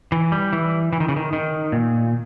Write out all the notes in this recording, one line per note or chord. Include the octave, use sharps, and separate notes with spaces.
E3
G3
E3
E3
D#3
C#3
D#3
D#3
A#2